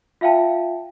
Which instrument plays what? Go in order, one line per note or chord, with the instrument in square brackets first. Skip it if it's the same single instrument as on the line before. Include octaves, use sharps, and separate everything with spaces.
[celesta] F4 E5 F5 G5 A5